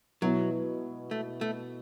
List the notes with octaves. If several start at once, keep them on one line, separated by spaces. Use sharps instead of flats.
B2 F#3 B3 E4
A3
A3